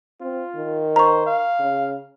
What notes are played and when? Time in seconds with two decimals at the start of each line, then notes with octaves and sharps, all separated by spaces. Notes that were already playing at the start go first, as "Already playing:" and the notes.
0.21 C4 F4
0.56 D#3
0.96 C5 A#5 C#6
1.27 F5
1.59 C#3